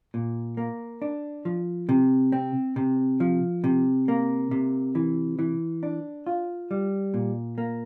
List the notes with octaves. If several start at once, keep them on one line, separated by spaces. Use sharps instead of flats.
A#2
A#3
D4
F3
C3
C4
C3
F3
C3
A#3
C3
E3
E3
D4
F4
G3
A#2
A#3